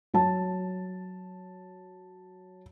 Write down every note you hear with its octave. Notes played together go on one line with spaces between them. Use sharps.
F#3 A5